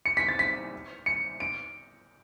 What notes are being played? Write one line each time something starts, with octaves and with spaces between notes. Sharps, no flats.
C#7
B6
A6
B6
C#7
D7